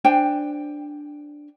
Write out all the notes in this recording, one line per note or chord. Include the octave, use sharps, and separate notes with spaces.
D4 C5 G5 G#5